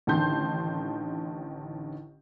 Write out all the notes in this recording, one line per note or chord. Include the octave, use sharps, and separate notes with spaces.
A1 D3 D#3 A5 C6 G6